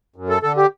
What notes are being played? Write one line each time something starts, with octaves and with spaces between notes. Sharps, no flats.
F#2
A4
D3 A4
G4